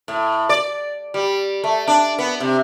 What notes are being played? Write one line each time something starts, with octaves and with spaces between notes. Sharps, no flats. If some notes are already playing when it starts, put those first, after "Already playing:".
A2
D5
G3
A3
D4
B3
C3